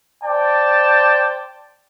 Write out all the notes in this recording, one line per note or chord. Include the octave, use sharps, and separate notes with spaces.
C5 D5 G5 A5